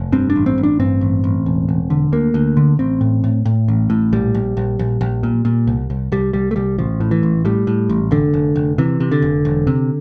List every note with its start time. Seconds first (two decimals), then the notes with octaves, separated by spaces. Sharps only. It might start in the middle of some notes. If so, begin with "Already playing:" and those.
Already playing: F1
0.12 G2 C4
0.30 D4
0.36 A1
0.46 C4
0.58 A1
0.63 D4
0.80 G2 C4
1.01 A1
1.24 A1
1.46 E1
1.69 E1
1.90 D3
2.12 D2 A#3
2.34 D2
2.57 D3
2.79 A1 C4
3.01 A2
3.24 A2
3.46 A2
3.68 A1
3.90 A2
4.13 A#1 G3
4.34 A#1
4.57 A#1
4.79 A#1
5.01 A#1
5.23 A#2
5.45 A#2
5.67 C2
5.90 C2
6.12 C2 G3
6.33 C2 G3
6.51 A3
6.56 C2 G3
6.78 A1 F3
7.00 A2
7.11 E3
7.23 A1
7.45 A2 G3
7.67 A2
7.89 A1
8.11 F1 D3
8.34 F1
8.56 F1
8.78 C3 E3
9.00 C3
9.11 D3
9.22 F1
9.45 E1
9.67 C3